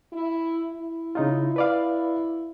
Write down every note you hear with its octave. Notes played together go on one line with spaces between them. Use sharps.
E4
E4
C#3 D#4 F4
B4 D5 F5